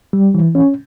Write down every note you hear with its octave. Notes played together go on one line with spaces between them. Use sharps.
G3
E3
C#4